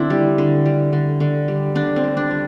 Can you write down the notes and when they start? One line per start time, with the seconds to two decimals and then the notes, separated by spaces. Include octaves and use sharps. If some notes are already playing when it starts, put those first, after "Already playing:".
Already playing: D3 C4 D4 E4
0.10 G3
0.38 D3
0.66 G3
0.93 D3
1.20 D3
1.48 G3
1.75 D3 D4
1.96 C4
2.03 G3
2.17 D4
2.31 G3